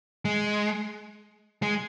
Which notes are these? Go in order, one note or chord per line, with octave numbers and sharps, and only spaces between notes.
G#3
G#3